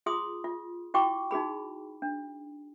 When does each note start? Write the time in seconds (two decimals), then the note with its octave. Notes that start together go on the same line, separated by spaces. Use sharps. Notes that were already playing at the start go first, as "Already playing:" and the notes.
0.06 F4 G#4 C6 D#6
0.44 F4
0.94 E4 F#4 G5 C#6 D6
1.31 D#4 F#4 G#4 B5
2.02 D4